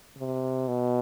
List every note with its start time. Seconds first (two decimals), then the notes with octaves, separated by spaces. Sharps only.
0.18 C3
0.68 B2